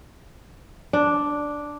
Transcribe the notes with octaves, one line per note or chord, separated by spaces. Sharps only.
D4